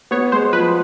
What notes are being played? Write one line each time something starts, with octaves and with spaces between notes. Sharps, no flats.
B3 C#5
G#3 C5
F3 B4